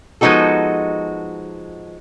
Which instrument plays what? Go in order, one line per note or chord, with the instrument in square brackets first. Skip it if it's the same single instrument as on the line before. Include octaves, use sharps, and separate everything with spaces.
[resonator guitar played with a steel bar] F3 G#3 B3 D#4 F#4 A4